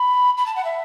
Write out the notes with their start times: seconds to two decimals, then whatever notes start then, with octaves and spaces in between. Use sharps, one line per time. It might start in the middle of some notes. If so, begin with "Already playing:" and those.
Already playing: B5
0.38 B5
0.46 A5
0.56 F#5
0.65 E5